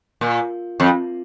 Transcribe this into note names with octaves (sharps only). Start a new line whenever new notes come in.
A#2
F2